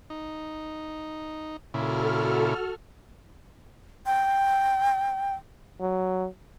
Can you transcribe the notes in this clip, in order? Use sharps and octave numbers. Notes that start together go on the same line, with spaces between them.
D#4
A#2 C#3 E4 F#4 A4 F6
G5
F#3